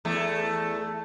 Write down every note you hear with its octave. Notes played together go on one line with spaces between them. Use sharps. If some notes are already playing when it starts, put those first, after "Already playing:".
E2 A3